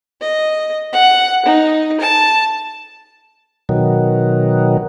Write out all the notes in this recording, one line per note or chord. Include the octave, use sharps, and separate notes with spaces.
D#5
F#5
D#4
A5
B2 D#3 F#3